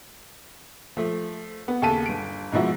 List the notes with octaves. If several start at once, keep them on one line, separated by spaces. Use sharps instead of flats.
F3 A3
B3
D#2 C#3 A4 A5 B6 D#7
G1 D7
G#2 B2 F3 E4 F#4